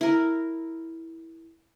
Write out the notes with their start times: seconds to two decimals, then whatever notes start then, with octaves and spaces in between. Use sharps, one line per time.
0.01 E4 A#4